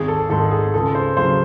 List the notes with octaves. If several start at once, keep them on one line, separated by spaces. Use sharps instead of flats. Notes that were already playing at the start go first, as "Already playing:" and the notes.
Already playing: G#1 G#4
A4
G#2 D#3 A4
G#4
C#2 A4
C5
C#3 F#3 C5